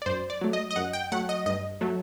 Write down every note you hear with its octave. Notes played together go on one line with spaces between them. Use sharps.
D5
F#2 C5
D5
F#3 A3
D#5
D#5
F#2 F#5
G5
F#3 A3 F#5
D#5
G2 D#5
F#3 A3